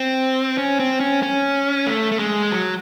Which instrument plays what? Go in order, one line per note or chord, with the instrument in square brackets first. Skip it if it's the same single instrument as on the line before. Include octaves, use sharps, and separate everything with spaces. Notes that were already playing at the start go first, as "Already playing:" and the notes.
Already playing: [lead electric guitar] C4
C#4
C4
C#4
C#4
A3
A3
G#3
F#3